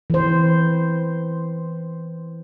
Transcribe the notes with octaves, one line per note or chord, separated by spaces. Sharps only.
E3 C5